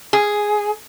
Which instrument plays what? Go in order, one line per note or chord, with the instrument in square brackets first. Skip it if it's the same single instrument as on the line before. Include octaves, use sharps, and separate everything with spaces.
[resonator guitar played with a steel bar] G#4